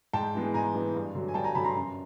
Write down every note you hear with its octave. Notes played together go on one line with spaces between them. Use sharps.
G#2 G5 A5
E3 G#3 B3
G#2 G#5 A#5
E3 G#3 B3
G2
D3 F#3
G#5
G2 G5 A5
G#5 A#5
D3 F#3 A5 B5
A#5 C6
F#2